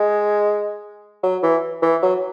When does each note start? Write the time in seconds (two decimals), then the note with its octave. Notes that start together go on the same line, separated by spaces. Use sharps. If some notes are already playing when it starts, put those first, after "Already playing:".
Already playing: G#3
1.23 F#3
1.43 E3
1.82 E3
2.02 F#3